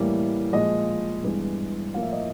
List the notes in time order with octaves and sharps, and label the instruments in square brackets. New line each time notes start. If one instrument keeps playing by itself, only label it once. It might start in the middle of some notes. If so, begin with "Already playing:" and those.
Already playing: [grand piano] A2 E3 G3 A#3
A#2 F3 G#3 D#5
G2 E3 G#3 B3
A2 F3 A#3 F5
E5
D#5